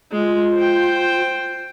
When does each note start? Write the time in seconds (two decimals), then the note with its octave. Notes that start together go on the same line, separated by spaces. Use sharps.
0.12 G#3 F4
0.54 C5 G5